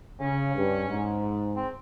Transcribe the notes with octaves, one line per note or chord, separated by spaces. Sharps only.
C#3 C#4
G2
G#2
C4